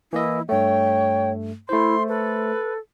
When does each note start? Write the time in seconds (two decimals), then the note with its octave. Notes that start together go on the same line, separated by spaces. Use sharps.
0.13 E3 A#3 E4 D#5
0.49 G2 A3 C#5 G5
1.69 A3 E4 C5 C6
2.08 A4 B4